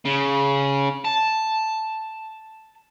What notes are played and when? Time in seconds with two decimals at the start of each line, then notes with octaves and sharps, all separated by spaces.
0.05 C#3
1.05 A5